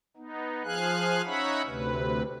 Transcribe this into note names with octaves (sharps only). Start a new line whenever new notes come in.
B3 D#4
F3 G#4 F5 G#5 F#6
C#4 D#4 C#5 E5 F#5 B5
D2 C3 B4